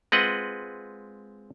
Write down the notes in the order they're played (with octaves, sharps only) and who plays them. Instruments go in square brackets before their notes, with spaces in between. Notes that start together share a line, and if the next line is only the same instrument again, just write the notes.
[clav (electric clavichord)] G#3 C4 F4 B4 D#5 F#5